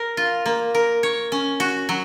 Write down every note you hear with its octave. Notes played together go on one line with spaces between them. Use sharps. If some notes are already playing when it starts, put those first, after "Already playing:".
Already playing: A#4
F4
A#3
A#4
C#5
C#4
F#4
F#3